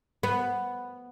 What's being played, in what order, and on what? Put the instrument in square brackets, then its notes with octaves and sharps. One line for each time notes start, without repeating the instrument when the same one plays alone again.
[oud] B3